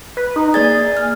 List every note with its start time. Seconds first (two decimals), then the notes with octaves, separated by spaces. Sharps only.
0.17 B4
0.36 D#4
0.54 A#3 G#4 D5 A6
0.97 F6